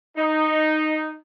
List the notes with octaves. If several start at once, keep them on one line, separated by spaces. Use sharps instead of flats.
D#4